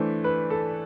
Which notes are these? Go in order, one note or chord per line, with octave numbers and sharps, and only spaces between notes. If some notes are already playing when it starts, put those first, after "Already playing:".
Already playing: E3 A3 D4 C5
B4
A4